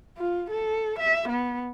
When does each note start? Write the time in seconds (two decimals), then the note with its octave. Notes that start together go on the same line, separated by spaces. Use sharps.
0.18 F4
0.51 A4
0.99 E5
1.29 B3